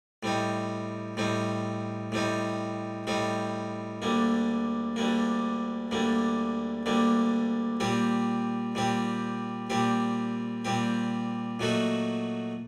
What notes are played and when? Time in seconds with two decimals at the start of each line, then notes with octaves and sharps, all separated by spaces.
0.23 A2 G3 C4 D#4
1.17 A2 G3 C4 D#4
2.12 A2 G3 C4 D#4
3.07 A2 G3 C4 D#4
4.02 D2 D3 G3 A#3
4.96 D2 D3 G3 A#3
5.91 D2 D3 G3 A#3
6.86 D2 D3 G3 A#3
7.80 A#2 G3 C4 G4
8.75 A#2 G3 C4 G4
9.70 A#2 G3 C4 G4
10.65 A#2 G3 C4 G4
11.60 A#2 F#3 A3 D#4 F#4